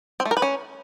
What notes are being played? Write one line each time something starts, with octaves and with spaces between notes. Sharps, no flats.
C4
A3
A#4
B4
C#4